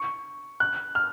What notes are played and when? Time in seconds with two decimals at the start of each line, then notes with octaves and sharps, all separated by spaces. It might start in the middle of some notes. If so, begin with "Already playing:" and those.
Already playing: C#6
0.60 F#6
0.95 F6